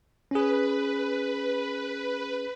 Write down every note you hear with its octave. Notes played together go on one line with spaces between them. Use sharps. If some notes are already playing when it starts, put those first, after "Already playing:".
C#4 G#4 B4